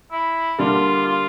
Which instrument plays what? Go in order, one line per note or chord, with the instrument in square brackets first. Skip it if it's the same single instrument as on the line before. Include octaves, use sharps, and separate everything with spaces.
[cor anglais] E4
[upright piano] D3 G3 A#3 D4 [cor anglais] F4
[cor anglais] F4